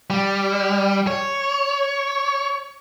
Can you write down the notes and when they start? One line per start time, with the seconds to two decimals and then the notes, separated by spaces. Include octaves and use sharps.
0.10 G3
1.07 C#5